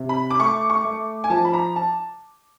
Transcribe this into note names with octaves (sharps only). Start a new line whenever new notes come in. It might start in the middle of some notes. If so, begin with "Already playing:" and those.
Already playing: C3
B5
D6
A3 C#6
C#6
A3
G#5
F3 A5
B5
A#5
A5